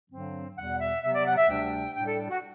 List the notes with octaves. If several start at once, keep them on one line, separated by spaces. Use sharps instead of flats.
G2 D3 F#3 C4
E2 B2 G3 F#5
E5
C3 F#3 B3 E5
D5
F#5
E5
D2 C3 G3 D4 G5
A2 G3 D4 G5
A4
F#4